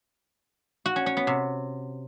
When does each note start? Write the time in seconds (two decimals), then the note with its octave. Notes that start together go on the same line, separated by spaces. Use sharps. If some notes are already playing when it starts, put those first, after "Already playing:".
0.86 F#4
0.96 C#4
1.06 C#4
1.17 B3
1.27 C3